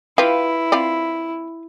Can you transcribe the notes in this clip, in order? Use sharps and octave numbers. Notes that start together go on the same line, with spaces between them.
E4 F4 G4 B4 F5
C4 F4 D5